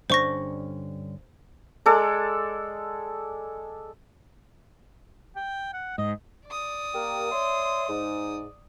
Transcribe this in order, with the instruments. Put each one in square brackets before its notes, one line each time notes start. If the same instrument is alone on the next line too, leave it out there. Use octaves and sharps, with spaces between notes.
[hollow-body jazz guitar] G2 D3 C#4 [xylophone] C5 C#6 A#6
[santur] G#3 A4 D5
[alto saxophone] G5
F#5
[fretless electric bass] G#2 [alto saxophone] D#5
[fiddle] D5 D#6
[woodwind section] A#3 G4 A#4
C#5 E5 C6
G#2